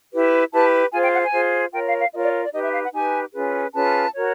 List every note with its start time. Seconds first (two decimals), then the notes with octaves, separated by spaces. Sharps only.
0.12 E4 G4 B4
0.52 E4 G4 B4 A5
0.92 F4 G#4 C5 G#5
1.02 G5
1.13 F#5
1.23 G#5
1.32 F4 G#4 C5
1.73 F4 A#4 C#5 G5
1.86 F5
1.99 F5
2.12 F4 A#4 C#5 D#5
2.23 D5
2.43 D5
2.53 D#4 G4 B4 D#5
2.63 E5
2.73 F5
2.83 F#5
2.93 D#4 G4 B4 G#5
3.33 C#4 F4 G#4 B4
3.73 C#4 F4 G#4 B4 A5
4.13 F#4 A#4 C#5